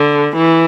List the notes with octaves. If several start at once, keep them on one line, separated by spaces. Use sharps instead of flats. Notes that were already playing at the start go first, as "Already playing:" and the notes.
Already playing: D3
E3